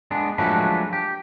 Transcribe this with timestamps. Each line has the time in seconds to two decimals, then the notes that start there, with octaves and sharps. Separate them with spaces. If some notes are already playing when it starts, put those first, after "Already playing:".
0.11 G#3 B3 D4
0.38 F3 F#3 G#3 A3 D4 B4
0.93 G4